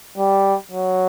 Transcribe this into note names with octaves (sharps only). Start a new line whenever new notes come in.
G3
F#3